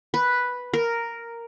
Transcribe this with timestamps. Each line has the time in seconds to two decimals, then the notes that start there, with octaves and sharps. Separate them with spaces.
0.14 B4
0.74 A#4